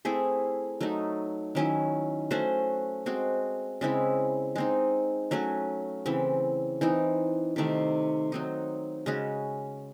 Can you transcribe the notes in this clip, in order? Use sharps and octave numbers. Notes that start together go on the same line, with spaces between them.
A3 C4 E4 G#4
F#3 A3 D#4
D#3 F#3 C#4 E4
A3 C#4 F#4 C5
G#3 C4 F#4
C#3 G#3 C4 E4
G#3 C4 D#4
F#3 A3 C#4 F#4
C#3 E3 C4
E3 C4 D#4
C3 D#3 A3
F#3 C4 D#4
C#3 G#3 C#4 F#4